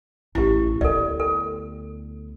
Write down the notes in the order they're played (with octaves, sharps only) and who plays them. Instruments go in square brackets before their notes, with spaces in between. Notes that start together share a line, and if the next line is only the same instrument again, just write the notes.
[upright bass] A1 A2 [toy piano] E4 G4
[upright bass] D2 B3 [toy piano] A4 D5
[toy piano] A4